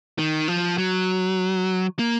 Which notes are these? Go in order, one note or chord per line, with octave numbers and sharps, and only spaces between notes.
D#3
F3
F#3
A#3